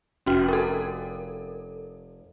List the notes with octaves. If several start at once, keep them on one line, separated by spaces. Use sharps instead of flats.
F1 C#4 F#4 G5
A4 A#4